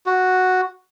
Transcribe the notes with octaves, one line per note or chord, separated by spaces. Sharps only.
F#4